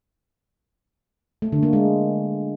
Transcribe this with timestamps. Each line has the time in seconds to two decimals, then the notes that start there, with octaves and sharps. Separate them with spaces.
1.42 A3
1.52 D3
1.63 A#3
1.73 G#3